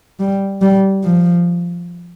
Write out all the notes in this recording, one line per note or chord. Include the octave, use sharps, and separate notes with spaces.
G3
G3
F3